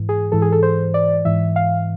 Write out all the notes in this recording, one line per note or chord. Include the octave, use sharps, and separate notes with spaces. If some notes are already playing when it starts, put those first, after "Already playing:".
Already playing: G#2 E3
G#4
G#2 E3 A4
G#4
A4
C5
D5
G#2 E3 E5
F5